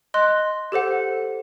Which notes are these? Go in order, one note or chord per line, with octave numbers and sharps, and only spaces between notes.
D#5 C6 F#6
G4 A4 C5 F#5